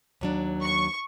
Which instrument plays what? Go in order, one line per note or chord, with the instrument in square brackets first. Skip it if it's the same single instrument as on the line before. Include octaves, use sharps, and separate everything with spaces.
[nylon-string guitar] D#2 F#3 D4
[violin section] C#6